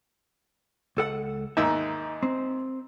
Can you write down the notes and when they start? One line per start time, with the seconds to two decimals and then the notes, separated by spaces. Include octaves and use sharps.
0.97 C#2 A4 F#5
1.57 D#2 G#2 E5 E6
2.23 C4